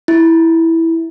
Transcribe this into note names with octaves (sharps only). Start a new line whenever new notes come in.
E4